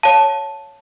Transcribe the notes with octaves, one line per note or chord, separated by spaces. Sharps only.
C#5 F5 A5